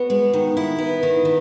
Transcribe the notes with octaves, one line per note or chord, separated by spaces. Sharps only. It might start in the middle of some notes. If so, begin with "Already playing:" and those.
Already playing: B3 F#4
G#3
D#3
E4
B3
D#3
D#3